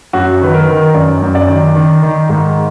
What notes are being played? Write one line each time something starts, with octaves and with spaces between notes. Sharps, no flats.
F#2 F#4
D#3 B4
A#4
D#3
F#2 D5
F#2
D5
D#3
D#3
D#3
G#2